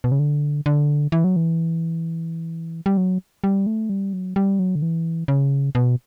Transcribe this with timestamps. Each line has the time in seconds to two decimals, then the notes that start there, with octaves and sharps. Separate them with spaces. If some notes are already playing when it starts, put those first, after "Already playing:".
0.04 B2
0.12 C#3
0.19 D3
0.66 D3
1.12 E3
1.24 F#3
1.36 E3
2.86 G3
2.97 F#3
3.44 G3
3.67 A3
3.89 G3
4.13 F#3
4.36 G3
4.59 F#3
4.75 D3
4.82 E3
5.28 C#3
5.75 B2